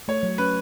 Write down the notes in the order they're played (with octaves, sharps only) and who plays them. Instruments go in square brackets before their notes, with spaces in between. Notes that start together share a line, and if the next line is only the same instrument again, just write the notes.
[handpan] A3 [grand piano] C#5
[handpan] F#3
[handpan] C#4 [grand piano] B4